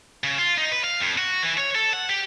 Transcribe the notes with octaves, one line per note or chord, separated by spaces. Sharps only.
C#3
F4
D#4
B4
F5
F2
F#4
E3
C#5
A4
F#5
G4